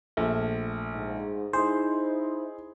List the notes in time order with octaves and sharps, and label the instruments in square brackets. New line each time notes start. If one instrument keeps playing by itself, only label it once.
[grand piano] A#1 [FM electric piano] A3
[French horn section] G#2
[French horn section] D#4 E4 [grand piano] G#4 [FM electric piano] C5